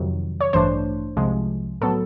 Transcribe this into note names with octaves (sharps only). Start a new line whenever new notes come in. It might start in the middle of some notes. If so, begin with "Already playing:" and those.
Already playing: F2 C3 D#3 F#3
C#5
A1 G2 E3 A3 D4 C5
C2 C3 F3 G#3
A2 F#3 B3 A4